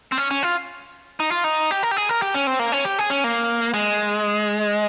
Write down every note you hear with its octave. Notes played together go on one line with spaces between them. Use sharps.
C4
C#4
C#4
F4
D#4
F4
D#4
G4
A#4
G4
G#4
A#4
G4
C#4
C4
A#3
C#4
G4
G#4
C#4
A#3
G#3